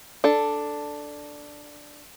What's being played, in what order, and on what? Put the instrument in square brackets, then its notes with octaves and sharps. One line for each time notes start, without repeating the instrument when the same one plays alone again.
[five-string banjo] D4 A4